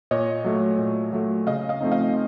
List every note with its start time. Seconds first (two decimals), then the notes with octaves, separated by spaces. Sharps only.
0.11 A#2 C#5 D#5
0.45 F#3 A3
0.78 A#2
1.13 F#3 A3
1.47 C#3 D#5 F5
1.69 D#5 F5
1.81 F3 A3 C4 D#4
1.92 D#5 F5